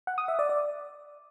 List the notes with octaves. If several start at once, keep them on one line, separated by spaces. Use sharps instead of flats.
F#5
D#6
E5
D5
D5